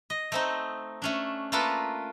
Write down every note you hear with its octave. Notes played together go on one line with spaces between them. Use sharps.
D#5
A3 C4 D#4
A3 C#4 D4
A3 A#3 F4 A4 B4